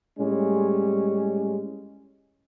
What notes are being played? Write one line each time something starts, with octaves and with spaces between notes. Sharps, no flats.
A2 G3 G#3 C#4